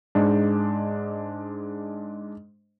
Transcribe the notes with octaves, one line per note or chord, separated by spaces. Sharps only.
G#2 G#3 D4